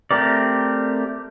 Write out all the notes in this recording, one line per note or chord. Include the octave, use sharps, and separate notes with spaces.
A3 C4 G4 A#4 D5